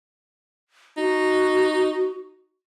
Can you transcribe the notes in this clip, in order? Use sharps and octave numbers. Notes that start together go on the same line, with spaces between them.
D#4 F#4